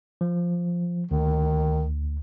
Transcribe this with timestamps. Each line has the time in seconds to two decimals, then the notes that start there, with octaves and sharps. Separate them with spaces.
0.21 F3
1.11 D2 D#3